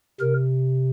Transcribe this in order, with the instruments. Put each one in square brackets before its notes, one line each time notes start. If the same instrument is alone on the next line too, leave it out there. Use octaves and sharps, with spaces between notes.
[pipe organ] C3 A#4